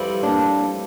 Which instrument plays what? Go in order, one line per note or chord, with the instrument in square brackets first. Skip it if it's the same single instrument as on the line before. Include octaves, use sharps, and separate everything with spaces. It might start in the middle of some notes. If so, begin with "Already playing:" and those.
Already playing: [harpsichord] F2 E3 G3 C4
[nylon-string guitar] A#3 D4